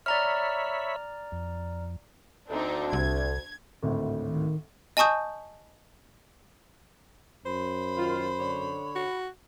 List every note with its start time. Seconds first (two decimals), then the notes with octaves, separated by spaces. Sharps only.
0.06 C#5 D5 E5 A#5 B5 F6
1.32 F2
2.49 D2 C4 D4 D#4
2.93 C2 G#6
3.83 G#1 D2 A2
4.27 D#3
4.97 D#5 G#5 A5 C#6 D#6 G6
7.45 F#2 C5 B5
7.97 D#3 F4
8.39 D3 C#5
8.95 F#4